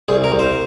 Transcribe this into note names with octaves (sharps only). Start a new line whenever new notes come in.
C2 G#4
A#4
C2
C5